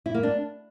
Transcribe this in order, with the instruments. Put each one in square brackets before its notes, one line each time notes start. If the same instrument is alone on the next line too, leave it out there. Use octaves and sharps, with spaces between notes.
[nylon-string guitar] E4
A#3
D4